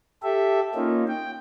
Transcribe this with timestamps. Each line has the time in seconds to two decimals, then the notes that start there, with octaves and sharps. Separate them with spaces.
0.23 G4 A4 E5
0.75 A#3 C#4 D#4 F4
1.08 G5